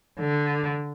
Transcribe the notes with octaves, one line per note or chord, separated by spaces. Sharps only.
D3